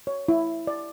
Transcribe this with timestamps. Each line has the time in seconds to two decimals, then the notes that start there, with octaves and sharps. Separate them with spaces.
0.07 C#5
0.28 E4
0.67 D5